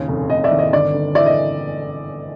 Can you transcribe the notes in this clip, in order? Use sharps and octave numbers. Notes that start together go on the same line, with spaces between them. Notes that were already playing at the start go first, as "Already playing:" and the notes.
Already playing: D#2 C#3
F1
F1 D#5
D5 E5
D#3
D#5
G1 D5
G1
E3 D5 E5
D#5